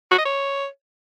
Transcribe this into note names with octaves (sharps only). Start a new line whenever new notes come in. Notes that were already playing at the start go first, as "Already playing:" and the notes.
F#4
D#5
C#5